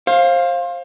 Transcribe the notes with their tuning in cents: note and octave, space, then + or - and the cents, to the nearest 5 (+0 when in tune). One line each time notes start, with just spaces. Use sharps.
C5 +30 F5 +0